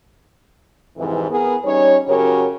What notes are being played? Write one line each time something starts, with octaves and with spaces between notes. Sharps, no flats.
F2 G#2 C3 E3
B3 G#4 A#4 B4
G3 C#4 D#4 C#5
F#2 C#3 F#4 G4 A#4 C#5